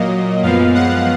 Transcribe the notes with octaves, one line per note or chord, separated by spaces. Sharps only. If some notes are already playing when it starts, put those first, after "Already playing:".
Already playing: A#2 F#3 A#3 D#5
F#2 F3 G#3 B3 F5
F#5